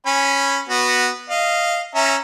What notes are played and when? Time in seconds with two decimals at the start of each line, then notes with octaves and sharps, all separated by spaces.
0.06 C#4 G#5 B5
0.69 B3 F#4
1.30 D#5 F5
1.95 C#4 E5 A#5